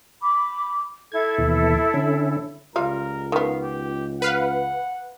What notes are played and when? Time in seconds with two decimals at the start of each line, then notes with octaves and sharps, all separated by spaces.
0.22 B5 D6
1.12 E4 A4 G#6
1.38 D#2 B2 E3
1.94 D3 C#4
2.76 C#2 G3 F4 A#4 F5
3.32 D#3 B3 F5
3.63 G4
4.22 B4 F5 F#5